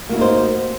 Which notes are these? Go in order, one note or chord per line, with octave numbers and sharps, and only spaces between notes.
A#3 D#4 E4 F#4 C5